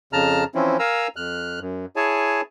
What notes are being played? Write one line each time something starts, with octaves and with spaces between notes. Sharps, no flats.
F2 C#3 A5 A#5 F6
E3 F3 C4 C#4 E4
A#4 F5 G#5 A#5 E6
F2 F6 F#6
F#2
E4 G#4 C#5 G#5 A5